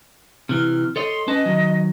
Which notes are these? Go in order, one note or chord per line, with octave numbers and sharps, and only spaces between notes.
C3 E3 F6
A4 C#5 D#5 C6
C#4 B4 D#5 A5
D#3 F#3